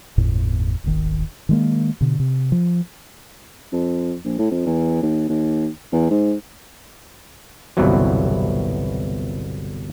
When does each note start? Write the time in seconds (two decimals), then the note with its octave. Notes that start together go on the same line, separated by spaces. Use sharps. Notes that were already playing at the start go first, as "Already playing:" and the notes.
0.18 G1 E2 A2
0.84 D#1 G#1 D#3
1.49 D#3 G#3 A#3
2.01 B2 D3
2.20 C3
2.52 F3
3.73 F2
4.25 A#1
4.39 A2
4.51 F2
4.66 E2
5.03 D#2
5.29 D#2
5.92 E2
6.11 G#2
7.77 G1 C2 B2 E3 F#3